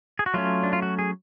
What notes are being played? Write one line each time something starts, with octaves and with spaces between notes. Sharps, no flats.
G#4
F#4
F#3 A3 C#4 F4
D4
F4
F#4
G#4